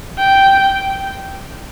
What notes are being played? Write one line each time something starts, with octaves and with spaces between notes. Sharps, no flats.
G5